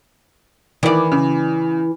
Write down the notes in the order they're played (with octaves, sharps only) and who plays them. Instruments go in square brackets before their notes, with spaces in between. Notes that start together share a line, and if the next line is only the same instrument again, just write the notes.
[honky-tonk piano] D#3 [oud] E3 D5
[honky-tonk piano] C#3